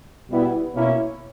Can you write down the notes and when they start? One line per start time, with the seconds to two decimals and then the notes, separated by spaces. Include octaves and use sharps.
0.30 B2 G3 B3 E4
0.75 B2 A#3 C#4 E4